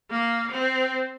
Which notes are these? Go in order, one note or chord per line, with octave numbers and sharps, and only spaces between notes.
A#3
C4